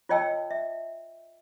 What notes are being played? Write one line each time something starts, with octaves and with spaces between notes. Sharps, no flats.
F4 C#5 D#5 G5 A5 E6
E5